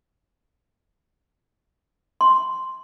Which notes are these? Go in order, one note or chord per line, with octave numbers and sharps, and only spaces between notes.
C6